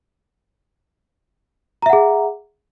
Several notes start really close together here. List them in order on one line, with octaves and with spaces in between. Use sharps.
A#5 E5 F#5 G#4